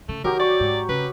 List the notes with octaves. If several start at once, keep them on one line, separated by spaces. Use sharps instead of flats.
C#3 A3
D#3 F#3 F#4 G4 A#4
C#5 D5 C#6
G#2
C#3 B4